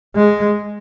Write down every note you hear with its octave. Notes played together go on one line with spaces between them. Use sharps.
G#3